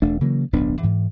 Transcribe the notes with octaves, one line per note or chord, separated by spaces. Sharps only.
E1 A3 D4
C#3 E3 F#3 A#3
D1 B1 B3 D4
G#2 E3